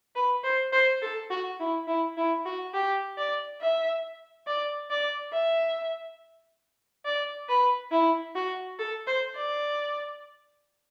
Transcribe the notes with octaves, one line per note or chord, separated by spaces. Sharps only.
B4
C5
C5
A4
F#4
E4
E4
E4
F#4
G4
D5
E5
D5
D5
E5
D5
B4
E4
F#4
A4
C5
D5